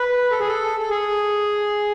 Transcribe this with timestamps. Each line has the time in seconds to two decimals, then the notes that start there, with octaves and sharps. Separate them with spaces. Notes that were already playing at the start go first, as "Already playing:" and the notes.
Already playing: B4
0.31 A4
0.40 G#4
0.48 A4
0.80 A4
0.90 G#4